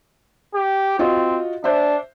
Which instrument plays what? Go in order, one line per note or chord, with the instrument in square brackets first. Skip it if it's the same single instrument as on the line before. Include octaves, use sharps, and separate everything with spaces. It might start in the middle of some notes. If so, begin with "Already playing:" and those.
[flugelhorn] G4
[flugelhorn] C4 [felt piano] F4 F#4 D#5
[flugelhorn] D4 [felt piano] C5 E5